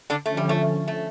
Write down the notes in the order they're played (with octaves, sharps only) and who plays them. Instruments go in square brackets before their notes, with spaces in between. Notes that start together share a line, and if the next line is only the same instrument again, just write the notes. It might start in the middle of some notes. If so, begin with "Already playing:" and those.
[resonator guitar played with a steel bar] D3 D4
[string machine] D3 F3 C#4 [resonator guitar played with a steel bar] A3
[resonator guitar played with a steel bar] G3
A3
A3